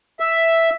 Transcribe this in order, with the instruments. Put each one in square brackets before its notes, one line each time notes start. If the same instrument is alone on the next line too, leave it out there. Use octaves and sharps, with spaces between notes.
[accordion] E5